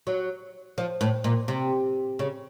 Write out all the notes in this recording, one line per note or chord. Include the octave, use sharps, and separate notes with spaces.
F#3
F3
A2
A#2
C3
C#3